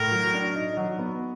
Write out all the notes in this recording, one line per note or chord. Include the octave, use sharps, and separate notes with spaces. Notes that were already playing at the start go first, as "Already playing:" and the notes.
Already playing: A2 A#4
F#3
D4
D#4
F#3
B3